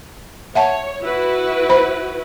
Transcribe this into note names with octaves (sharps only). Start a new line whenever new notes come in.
C#5 E5 F#5 A5
E4 F#4 B4
C5 B5